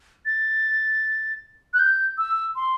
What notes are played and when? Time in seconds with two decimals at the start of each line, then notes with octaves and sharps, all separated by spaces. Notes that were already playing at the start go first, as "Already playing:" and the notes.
0.26 A6
1.74 F#6
1.79 G6
2.18 E6
2.56 C6